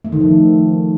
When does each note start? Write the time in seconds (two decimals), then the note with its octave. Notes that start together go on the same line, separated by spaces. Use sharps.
0.05 A3
0.12 D#3
0.20 F3